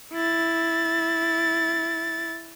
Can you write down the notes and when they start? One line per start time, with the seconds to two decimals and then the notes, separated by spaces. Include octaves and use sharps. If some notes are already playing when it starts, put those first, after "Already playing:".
0.13 E4 A6